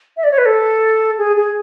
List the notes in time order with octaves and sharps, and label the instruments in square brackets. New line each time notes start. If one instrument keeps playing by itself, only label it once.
[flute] E5
D5
C#5
B4
A4
G#4
G#4